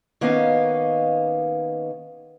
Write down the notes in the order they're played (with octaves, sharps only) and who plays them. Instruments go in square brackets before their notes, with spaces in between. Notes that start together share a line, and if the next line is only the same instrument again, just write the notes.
[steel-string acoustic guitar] D#3 A#3 B3 C#4 D#5 F5